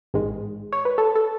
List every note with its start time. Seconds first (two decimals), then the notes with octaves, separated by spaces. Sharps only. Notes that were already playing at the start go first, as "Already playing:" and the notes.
0.14 A1 G#2 D#3 G#3
0.72 C#5
0.85 B4
0.98 A4
1.16 A4